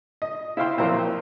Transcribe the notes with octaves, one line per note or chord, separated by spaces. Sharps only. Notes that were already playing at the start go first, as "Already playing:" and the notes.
D#5
E4 F4 C5 F5 G5 C6
A#2 F3 F#3 A#3 C4 E4